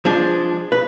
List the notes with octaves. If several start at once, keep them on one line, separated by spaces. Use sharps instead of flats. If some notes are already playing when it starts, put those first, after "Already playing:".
F3 G#3 D4
B4